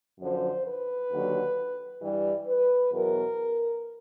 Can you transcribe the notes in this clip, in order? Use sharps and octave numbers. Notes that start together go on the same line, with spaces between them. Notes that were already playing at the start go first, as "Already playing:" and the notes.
F#2 D3 F3 C5
B4
D#2 D3 F#3
G2 E3 G3
B4
E2 B2 F#3 A#4